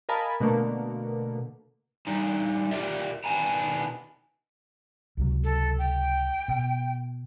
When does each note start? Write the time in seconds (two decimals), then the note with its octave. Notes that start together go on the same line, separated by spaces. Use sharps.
0.09 A#4 D#5 F5 G#5 A5 B5
0.40 B2 D3 A3 A#3
2.07 D3 G3 D#4
2.71 F4 G4 A#4 D5 E5
3.24 B2 D#3 B3 D4 G#5 A#5
5.17 C#2 C3 F#3
5.44 A4
5.79 G5
6.48 B2